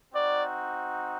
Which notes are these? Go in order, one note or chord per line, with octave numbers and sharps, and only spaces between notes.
C4 D#4 F#4 D5